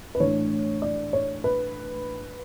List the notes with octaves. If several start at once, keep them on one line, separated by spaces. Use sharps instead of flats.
B4
A2 E3 A3 D4 C#5
D5
C#5
B4